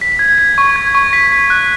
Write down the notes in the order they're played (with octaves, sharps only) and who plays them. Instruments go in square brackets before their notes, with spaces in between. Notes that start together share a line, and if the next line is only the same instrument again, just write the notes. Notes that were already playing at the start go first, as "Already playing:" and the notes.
[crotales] B6
G#6
B6
C#6
G#6
C#6
B6
B6
F#6